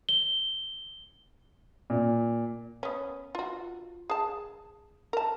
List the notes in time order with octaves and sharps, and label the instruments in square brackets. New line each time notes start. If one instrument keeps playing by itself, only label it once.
[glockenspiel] G7
[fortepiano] A#2
[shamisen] B3 C#4
F4 F#4
G#4 A5
A#4 A5